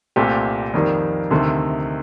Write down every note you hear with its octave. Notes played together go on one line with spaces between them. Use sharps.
C2 A#2 A3 C4 G4
F2 D#3 G3 A#3
D2 C3 D#3 A3